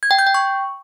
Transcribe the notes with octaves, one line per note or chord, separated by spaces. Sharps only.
G#6
G5
G6
G5
C#6